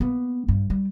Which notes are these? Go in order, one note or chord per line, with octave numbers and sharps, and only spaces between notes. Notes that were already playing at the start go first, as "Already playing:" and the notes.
A#3 B3
G2
G3